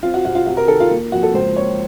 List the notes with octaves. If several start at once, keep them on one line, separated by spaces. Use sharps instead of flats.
C4 F4
F#4
C3 F#4
F4
C3 F#4
A#4
D#3 A4
F4
A#3
F2 F#4
A4
C#2 C5
A#3 C#5